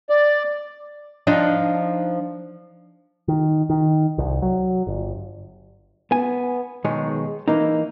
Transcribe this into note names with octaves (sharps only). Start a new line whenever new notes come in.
D5
F3 D4 D#4
D#3
D#3
C2
F#3
G1
B3 G#5
B1 D#3 G#3 G#4 C#5
E3 A#3 D#4